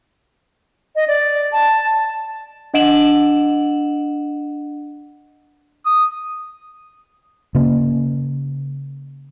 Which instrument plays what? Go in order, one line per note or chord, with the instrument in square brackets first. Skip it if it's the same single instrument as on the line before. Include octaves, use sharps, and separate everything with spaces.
[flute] D#5
D5
A5
[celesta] D4 D#5 F#5 D7 E7 F#7
[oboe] D#6
[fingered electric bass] C#3 A#3